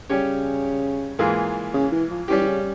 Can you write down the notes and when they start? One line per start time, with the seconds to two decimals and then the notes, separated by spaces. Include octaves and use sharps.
0.10 C#3 G3 C#4 G4 C#5
1.19 G#2 E3 A#3 F4 G#4
1.74 C#3
1.92 E3
2.10 F3
2.28 E3 G3 C#4 G4
2.41 E3
2.47 C#3